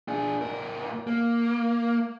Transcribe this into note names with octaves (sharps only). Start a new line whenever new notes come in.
D4 G#4
A2 A#4
A#3